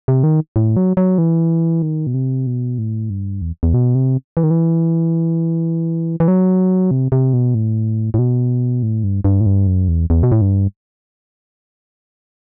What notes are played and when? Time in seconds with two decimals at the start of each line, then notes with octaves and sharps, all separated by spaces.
0.08 C3
0.23 D#3
0.56 A2
0.77 F#3
0.97 F#3
1.18 E3
1.82 D#3
2.07 B2
2.14 C3
2.47 B2
2.78 A2
3.10 G2
3.42 E2
3.63 E2
3.74 B2
3.95 C3
4.37 E3
4.43 D#3
4.51 E3
6.20 E3
6.28 F#3
6.91 C3
7.12 C3
7.33 B2
7.55 A2
8.14 A2
8.19 B2
8.83 A2
9.04 G2
9.25 G2
9.41 A2
9.46 G2
9.67 F#2
9.88 E2
10.10 E2
10.23 B2
10.32 A2
10.41 G2